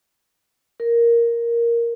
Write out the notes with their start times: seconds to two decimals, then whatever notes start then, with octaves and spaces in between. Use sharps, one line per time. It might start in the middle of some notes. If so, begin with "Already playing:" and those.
0.80 A#4